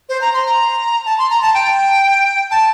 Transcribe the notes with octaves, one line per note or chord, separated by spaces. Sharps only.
C5
A#5
C6
A#5
A5
C6
A#5
A5
G5
A5